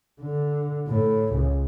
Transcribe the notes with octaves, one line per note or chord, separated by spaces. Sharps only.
D3
A2
C#2